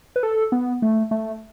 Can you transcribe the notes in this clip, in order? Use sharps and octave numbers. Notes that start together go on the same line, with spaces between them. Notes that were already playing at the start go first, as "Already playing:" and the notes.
B4
A4
B3
A3
A3